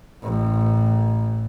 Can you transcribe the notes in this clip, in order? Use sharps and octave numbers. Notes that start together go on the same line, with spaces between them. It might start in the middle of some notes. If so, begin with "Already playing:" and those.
A1